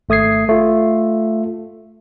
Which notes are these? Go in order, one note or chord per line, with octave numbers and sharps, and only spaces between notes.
G#1 A3 D#6 G#6 C7
A3 F4